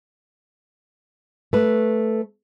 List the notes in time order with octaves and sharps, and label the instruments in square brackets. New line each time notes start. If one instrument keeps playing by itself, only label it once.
[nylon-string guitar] A3 B4